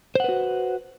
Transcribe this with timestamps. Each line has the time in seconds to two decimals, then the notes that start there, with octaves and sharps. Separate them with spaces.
0.15 C5
0.20 F#5
0.24 B4
0.29 F#4